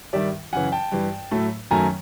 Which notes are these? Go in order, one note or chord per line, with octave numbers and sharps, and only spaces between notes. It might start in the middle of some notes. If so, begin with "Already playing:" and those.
G2 D#3 G3 D5 E5
F#2 C#3 E3 F#5 G#5
G5 A5
G2 E3 G3
A2 F#3 A3
F#2 D#3 F#3 A3 G#5 A#5